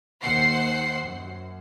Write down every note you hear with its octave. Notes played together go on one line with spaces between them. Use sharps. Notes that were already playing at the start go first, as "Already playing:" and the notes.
D#2 C5 F#5 C7
F#2